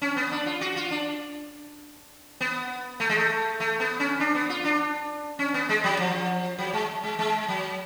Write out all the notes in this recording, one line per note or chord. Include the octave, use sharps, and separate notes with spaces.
C#4
B3
D4
F4
F#4
F4
D4
B3
A3
G#3
A3
A3
B3
C#4
D4
B3
F4
D4
C#4
B3
G#3
F#3
F3
F#3
G#3
G#3
G#3
F#3